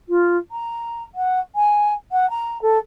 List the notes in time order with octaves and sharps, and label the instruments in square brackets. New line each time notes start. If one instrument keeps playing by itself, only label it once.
[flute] F4
A#5
F#5
G#5
F#5
A#5
A4